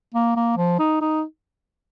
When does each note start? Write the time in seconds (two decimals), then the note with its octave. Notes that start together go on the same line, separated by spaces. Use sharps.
0.15 A#3
0.36 A#3
0.57 F3
0.79 D#4
1.01 D#4